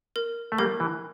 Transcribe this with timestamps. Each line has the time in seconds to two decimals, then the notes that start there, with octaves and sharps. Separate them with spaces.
0.16 A#4
0.52 A3
0.58 G3 A#3 A#4
0.80 E3